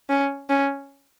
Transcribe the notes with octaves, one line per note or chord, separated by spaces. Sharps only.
C#4
C#4